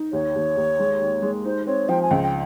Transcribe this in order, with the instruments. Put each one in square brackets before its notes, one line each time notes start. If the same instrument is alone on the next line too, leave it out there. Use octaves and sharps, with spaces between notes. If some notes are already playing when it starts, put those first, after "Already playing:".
Already playing: [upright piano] D#4
[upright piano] D#2 [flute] C#5
[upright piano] D#2
D#2
G#3
D#3
G#3
[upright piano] D#4 [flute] C5
[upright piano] C4 [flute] C#5
[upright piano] F3 [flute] G5
[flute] G#5
[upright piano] C#2 [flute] G5
[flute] G5